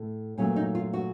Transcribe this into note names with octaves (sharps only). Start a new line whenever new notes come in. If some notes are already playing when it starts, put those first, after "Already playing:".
Already playing: A2 A3
A#2 F#3 A3 C#4
D#4
F4
F#4